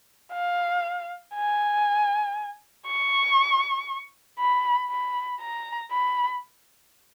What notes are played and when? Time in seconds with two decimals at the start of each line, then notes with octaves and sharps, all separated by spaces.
0.33 F5
1.34 G#5
2.87 C#6
4.39 B5
4.90 B5
5.41 A#5
5.91 B5